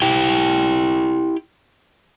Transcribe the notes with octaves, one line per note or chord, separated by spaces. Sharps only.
E4 G4 G5